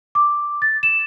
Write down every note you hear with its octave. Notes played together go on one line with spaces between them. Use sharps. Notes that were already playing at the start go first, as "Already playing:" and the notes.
D6
A6
E7